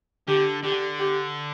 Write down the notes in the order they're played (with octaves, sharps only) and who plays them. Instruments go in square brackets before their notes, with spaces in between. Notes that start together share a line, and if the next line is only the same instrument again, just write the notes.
[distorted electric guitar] D3 [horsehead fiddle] G4
[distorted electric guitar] D3 [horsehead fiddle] G4
[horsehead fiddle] G4